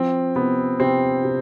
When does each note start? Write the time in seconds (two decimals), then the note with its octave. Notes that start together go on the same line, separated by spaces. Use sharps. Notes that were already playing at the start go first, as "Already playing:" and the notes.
Already playing: F3 C4
0.35 C3 B3
0.80 C3 C4
1.24 C3